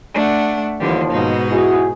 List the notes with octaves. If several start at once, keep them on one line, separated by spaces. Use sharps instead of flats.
A3 D4 F#5
D#2 D3 E3 F3 G3
G#2 B2 D#4
E4 F#4 G#4